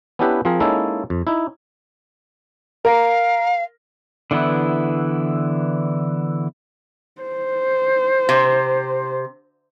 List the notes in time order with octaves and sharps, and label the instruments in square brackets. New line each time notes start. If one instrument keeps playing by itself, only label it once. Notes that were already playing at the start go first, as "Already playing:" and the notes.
[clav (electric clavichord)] B3 C#4 D4 E4 G4 B4
F3 C4 G#4 A#4
G#3 A#3 C#4 D#4 E4 A4
F2
D#4 E4
[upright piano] A#4 [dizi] F5
[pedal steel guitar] D3 E3 B3 E4
[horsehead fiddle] C5
[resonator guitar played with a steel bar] C3